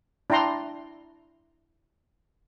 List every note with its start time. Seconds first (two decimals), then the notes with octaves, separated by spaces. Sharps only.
0.30 D4 E4 G5 A#5 C6